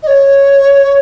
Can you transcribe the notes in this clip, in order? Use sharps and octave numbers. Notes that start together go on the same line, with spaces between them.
D#5
C#5